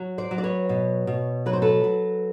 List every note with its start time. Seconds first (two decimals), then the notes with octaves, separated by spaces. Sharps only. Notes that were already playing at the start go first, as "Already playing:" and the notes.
Already playing: F#3
0.18 C5 D5
0.31 F#3
0.38 D5
0.43 B4 C#5
0.69 B2
1.07 B2
1.46 F#3 B4
1.53 C5
1.62 A4 B4
1.84 F#3